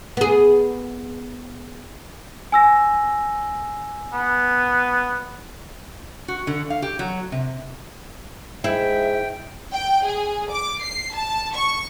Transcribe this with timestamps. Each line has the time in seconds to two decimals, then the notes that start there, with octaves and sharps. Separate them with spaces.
0.17 B3 G#4
2.52 G#5 E6 A#6
4.13 B3
6.28 F#4
6.47 D3
6.70 F5
6.82 G4
6.99 F#3
7.32 C3
8.64 G#2 E4 E5 G5
9.75 G5
10.06 G#4
10.52 D6
10.83 C7
11.15 A5
11.55 C#6